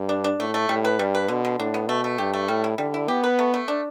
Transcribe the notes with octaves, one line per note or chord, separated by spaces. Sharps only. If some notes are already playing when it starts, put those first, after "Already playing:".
Already playing: G2
D4
D4
A2 A3
A3
A2 G3
B4
G2 G3
B4
B2 D3
D3
A2 D4
B3
B2 A3
A3
G2 G4
A3
A2 G3
E4
D3 G3
E4
B3 G4
B4
A3
A3
D4